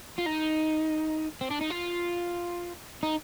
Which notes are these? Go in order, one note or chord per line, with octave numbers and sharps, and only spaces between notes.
F4
D#4
C4
D4
D#4
F4
D#4